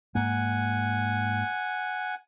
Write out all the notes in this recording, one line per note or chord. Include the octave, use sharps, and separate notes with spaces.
G#2 A#3 F#5 G#5